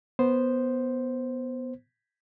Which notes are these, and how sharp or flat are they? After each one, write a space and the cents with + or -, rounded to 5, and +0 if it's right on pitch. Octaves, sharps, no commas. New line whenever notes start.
B3 +0 C5 +0